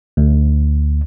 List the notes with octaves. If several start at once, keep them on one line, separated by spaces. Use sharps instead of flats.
D2